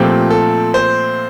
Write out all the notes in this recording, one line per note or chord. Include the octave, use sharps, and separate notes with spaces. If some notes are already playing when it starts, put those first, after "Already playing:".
Already playing: A#2 F3 A3 C4 G4
A4
C5